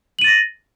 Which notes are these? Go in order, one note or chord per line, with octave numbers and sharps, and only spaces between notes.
A6 A#6 D#7 F#7